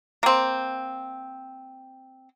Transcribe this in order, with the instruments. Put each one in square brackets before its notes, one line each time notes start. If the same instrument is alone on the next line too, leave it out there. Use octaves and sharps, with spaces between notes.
[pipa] A#3 C4